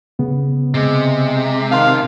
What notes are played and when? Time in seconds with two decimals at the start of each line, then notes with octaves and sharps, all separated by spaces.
0.19 C#3 B3
0.75 C3 G#3
1.72 D#3 F5 A5 C6 F#6